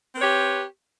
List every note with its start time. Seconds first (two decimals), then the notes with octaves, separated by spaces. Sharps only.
0.15 C4
0.18 B4
0.20 C#5
0.23 G4